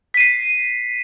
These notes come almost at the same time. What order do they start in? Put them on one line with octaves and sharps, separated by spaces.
B6 D#7 C7